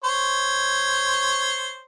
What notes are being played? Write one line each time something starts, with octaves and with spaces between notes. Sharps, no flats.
C5 C#5